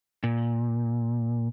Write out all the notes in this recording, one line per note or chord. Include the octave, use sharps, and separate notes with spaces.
A#2